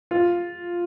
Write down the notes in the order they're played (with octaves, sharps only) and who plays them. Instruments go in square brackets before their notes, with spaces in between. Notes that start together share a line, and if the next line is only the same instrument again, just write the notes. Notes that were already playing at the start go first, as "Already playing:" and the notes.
[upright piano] F4